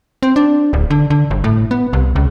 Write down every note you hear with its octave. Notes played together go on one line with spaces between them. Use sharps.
C4
D4
D1
D3
D3
G1
A2
B3
C2
C#2